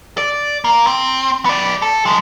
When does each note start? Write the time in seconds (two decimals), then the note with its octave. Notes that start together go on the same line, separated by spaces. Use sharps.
0.18 D5
0.64 A#3
0.87 C4
1.45 B3 D5
1.82 A4
2.06 F#2 G#3